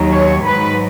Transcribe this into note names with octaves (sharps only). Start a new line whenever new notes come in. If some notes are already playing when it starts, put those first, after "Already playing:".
Already playing: D#2 D#3 F#3
C#5
G#2 F#3 B4